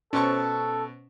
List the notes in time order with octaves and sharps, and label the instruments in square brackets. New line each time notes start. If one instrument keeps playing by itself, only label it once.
[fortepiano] B2 A5 C#6 [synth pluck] C#4 C5 [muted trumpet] A4